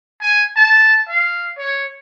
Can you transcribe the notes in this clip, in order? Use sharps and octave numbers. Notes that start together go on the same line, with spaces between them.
G#5
A5
F5
C#5